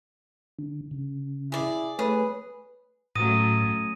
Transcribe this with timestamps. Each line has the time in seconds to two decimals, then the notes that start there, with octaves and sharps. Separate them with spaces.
0.59 D3
0.91 C#3
1.52 E4 G#4 D5
1.99 A3 G#4 B4 C#5
3.16 A2 F#3 A3 C#4 D#6 A#6 D#7